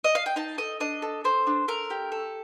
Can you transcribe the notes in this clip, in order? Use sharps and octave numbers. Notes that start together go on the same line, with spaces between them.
D#5
F5
G5
D#4 A5
A4 D#5
D4 D#5
A4
A4 C5
D4
A3 A#4
G4
A4